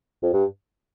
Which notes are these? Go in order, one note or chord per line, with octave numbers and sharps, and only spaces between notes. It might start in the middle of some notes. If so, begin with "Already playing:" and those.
F2
G2